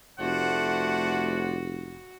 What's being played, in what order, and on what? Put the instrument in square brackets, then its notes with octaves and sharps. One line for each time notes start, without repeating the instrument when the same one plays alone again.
[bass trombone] F1 [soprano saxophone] A3 [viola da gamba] F#4 [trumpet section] C5 D5 F#5